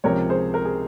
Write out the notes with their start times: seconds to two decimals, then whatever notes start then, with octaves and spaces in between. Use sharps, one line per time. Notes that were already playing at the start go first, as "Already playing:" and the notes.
0.04 C#2 C3 F3 A#4 C#5
0.29 G#4 C5
0.54 A#4
0.65 G#4